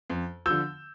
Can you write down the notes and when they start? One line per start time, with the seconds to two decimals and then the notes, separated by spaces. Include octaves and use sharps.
0.10 F2
0.46 D3 F3 E6 G6